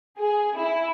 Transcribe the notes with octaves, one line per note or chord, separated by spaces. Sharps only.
G#4
E4